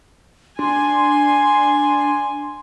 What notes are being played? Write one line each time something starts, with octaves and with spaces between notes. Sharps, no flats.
D4 G#5 C6